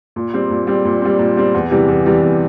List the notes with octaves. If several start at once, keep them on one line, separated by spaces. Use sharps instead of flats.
A#2
G3 C4
A#2
G3 C4
A#2
G3 C4
A#2
G3 C4
E2
C3 E3 G3
E2
C3 E3 G3
E2